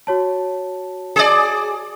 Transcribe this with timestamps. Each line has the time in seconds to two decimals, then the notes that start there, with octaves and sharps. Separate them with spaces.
0.07 F#4 C#5 A5
1.16 G#4 D5